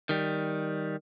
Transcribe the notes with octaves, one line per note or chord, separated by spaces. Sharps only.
D#3 G3